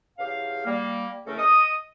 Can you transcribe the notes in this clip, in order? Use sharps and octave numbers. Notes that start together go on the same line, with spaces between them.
E2 C#3 G4 F5
G3 A#3
C#3 E3 A3 C#4 A4 A#4
D#5 D#6